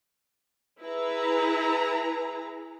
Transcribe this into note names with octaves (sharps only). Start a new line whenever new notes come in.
E4 G#4 B4 A#5